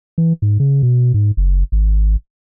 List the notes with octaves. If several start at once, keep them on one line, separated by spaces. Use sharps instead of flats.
E3
G#2
C#3
B2
G#2
F#1
G#1